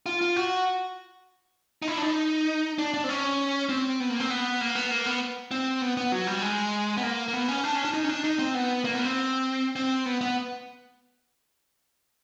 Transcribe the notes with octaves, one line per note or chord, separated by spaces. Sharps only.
F4
F4
F#4
D#4
E4
D4
D#4
D4
D4
C4
C#4
C4
B3
A#3
C4
B3
A#3
B3
A#3
B3
C4
B3
B3
F#3
G3
G#3
B3
A#3
A#3
B3
C#4
D4
C#4
D4
D#4
C#4
D4
D#4
C4
B3
A#3
B3
C4
C4
B3
B3